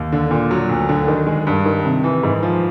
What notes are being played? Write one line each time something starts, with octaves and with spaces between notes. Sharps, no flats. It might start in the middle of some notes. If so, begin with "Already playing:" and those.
Already playing: D#2
D3
A#2
F#3
D2
D3
D#3
G#3
G2
D#3
C3
E3
G#2
F3